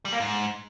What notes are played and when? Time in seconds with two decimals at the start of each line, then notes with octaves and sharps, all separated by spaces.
0.05 G3
0.13 A#3
0.20 G#2